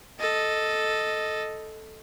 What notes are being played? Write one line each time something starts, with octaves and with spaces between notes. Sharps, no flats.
A4 D#5